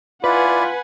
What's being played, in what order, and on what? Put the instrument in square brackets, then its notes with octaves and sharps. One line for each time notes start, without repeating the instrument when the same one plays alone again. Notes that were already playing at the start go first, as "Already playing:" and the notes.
[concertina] E4 D5 [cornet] F4 [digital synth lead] B4 [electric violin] F#5 G#5